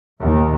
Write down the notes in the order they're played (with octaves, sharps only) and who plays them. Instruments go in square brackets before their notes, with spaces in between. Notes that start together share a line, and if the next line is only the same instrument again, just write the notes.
[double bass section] D#2